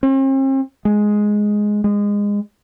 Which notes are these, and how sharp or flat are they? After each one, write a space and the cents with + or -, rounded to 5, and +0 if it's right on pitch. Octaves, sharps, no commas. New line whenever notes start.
C4 +45
G#3 +5
G#3 -20